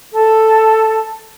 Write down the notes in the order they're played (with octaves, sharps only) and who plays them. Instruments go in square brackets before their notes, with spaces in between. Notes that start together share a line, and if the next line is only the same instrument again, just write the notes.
[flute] A4